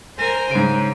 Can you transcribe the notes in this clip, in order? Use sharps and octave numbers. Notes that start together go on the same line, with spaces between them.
A#4 C5 G#5
G#2 C#3 D7